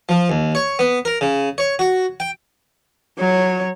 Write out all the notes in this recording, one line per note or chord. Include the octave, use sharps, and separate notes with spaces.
F3
D#2
C#5
B3
A#4
C#3
C#5
F#4
G5
F#3 C#5